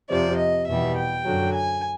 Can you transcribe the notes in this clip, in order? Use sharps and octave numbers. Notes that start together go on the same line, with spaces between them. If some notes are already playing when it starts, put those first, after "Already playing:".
F2 C3 F3 D5
D#5
E2 B2 G3 E5
G5
F#2 D3 F#3
G#5